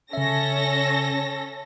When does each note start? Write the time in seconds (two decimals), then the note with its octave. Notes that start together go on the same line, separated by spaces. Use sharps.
0.13 C#3 C#4 A4 E5 A#6